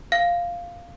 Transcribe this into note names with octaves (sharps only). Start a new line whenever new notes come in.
F5